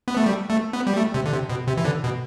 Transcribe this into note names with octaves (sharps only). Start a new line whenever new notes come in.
B3
A3
G3
A3
B3
G3
A3
C3
D3
C3
B2
C3
E3
D3
B2